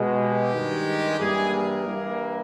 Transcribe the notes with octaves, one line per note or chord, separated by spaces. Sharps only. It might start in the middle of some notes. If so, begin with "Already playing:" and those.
Already playing: B2 G#3
G4
G2 D#3 G#3
G2 E3 G3 A#3 G#4
A#4
G2 E3 G3 A#3